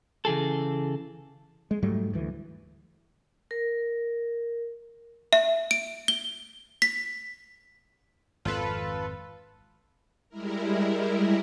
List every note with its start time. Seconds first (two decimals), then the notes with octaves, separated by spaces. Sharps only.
0.25 C#3 E3 G#4 A4
1.71 G#3
1.82 G#2 F#3 G3 A3
2.14 D2 E3
3.51 A#4
5.33 E5
5.71 D7
6.08 G7
6.82 B6
8.45 G#1 F2 F4 A4 B4
10.29 G3 G#3 E4 A#4